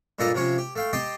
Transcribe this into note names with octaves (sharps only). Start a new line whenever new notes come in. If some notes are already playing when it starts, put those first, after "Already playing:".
G2 A#2 D4 A4 D#5 A#5
C3 F3 C#4 C#5
G4
A3 F5 G5
G4 D#5 G5 A5 C6